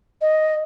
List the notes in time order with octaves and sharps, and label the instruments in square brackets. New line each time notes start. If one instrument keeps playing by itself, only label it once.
[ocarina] D#5